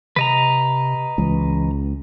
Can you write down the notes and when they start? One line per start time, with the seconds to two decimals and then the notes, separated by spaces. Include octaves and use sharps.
0.16 C3 B4 D#5 A#5
1.18 C#2 E3